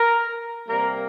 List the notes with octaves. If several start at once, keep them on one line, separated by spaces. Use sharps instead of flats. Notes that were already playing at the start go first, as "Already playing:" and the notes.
Already playing: A#4
C3 G3 A#3 A#4